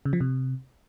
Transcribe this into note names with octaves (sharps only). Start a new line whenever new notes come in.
C#3
F3
C3